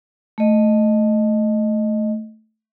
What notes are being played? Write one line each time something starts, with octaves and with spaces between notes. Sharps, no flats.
A3 D#5